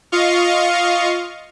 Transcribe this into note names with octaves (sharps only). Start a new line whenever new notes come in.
F4 D#5 F5 C#6